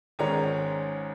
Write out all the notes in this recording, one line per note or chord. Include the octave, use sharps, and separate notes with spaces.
G#1 G#2 D#3 G#3 C#4 A#5